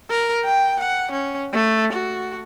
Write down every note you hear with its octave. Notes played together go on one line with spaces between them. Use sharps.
A#4
G5
F#5
C#4
A3
F#4